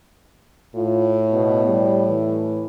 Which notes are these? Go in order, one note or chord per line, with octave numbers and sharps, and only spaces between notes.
A2 F4
B2
G3
E3